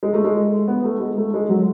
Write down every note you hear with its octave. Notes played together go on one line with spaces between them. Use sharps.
G#3
A3
G#3
B3
A3
G#3
A3
G#3
F#3